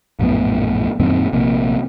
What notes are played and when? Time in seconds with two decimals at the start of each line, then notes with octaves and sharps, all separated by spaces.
0.19 A#1 F#2 A2 B3
1.00 F#2 A#2 D#3 C4
1.33 A#1 C3 A#3